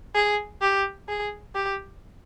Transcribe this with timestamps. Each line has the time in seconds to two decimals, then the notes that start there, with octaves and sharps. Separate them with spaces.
0.15 G#4
0.62 G4
1.08 G#4
1.55 G4